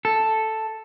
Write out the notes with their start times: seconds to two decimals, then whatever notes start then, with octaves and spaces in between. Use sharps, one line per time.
0.05 A4